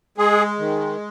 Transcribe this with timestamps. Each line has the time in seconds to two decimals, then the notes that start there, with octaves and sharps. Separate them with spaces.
0.18 G#3 G#4
0.59 D#3